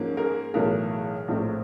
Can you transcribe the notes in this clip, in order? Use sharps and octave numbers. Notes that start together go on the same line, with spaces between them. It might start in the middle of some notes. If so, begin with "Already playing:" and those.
Already playing: G#2 F3 A#3 C#4
G#4 A#4
B1 A2 E3 A3 G#4 A#4
A#1 A2 F3 A3 C4